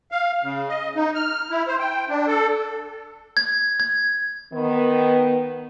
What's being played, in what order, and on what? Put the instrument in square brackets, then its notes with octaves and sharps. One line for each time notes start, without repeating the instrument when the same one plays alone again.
[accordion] F5
C#3
D#5
D#4
F6
E4
C5
G5
D4
A4
[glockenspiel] G#6
G#6
[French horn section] D#3 B3